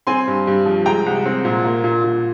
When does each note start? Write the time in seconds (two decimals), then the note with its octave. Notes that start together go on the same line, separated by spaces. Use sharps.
0.07 C4 G#5 C6
0.27 G2
0.47 G2
0.66 F3
0.86 G#3 G5 A#5
1.06 C2
1.26 C4
1.45 A#2
1.65 A#3
1.84 A#2
2.04 A#2